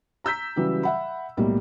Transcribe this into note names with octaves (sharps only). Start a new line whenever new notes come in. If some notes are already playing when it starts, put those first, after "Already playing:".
A#5 E6 G6 B6
C#3 E3 F#3 G3 G4
E5 F#5 B5
B1 A2 G3 A#3